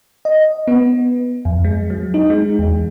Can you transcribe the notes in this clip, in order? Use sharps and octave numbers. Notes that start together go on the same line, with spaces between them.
D#5
B3
F2
G#3
F#3
D#4
G#3
E2